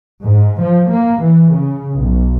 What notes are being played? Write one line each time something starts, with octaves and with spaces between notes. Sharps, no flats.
G#2
F3
A#3
E3
C#3
B1